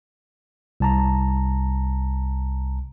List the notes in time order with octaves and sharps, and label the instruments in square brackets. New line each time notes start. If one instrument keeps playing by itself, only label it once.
[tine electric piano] C2 A5 A#5